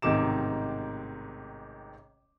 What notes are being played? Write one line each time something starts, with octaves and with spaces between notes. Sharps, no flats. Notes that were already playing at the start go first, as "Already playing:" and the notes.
A1 G#2 C3 D#3 D6 E7